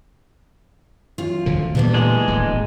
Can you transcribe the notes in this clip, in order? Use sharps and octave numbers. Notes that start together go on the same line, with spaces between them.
F#2 F4
D2 D3 F3
A#2 D3 E3 G3 B3 D4
G#3
D1 G#1 D2